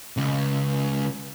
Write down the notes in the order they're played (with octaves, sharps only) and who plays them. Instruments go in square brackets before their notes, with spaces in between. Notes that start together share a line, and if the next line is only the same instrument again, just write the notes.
[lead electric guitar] C#2 C#3